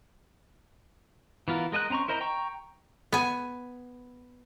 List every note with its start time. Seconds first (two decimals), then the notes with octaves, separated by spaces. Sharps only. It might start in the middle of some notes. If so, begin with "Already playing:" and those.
1.48 E3 B3 F4 A#4
1.72 G#3 A#4 D#5 G#5 F#6
1.90 C4 C#4 A#5 C6 C#6
2.08 E4 A#4 C5 D#5 A#5
2.21 G5 A#5 C#6
3.13 B3 G#5